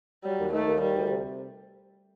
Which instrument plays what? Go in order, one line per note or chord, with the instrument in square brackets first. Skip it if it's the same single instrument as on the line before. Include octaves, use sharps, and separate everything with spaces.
[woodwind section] F#3 [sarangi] G3
[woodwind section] D#2
[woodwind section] D#3 [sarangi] A3
[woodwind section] D#2
[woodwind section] D#3 [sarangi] G3
[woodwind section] D2
C3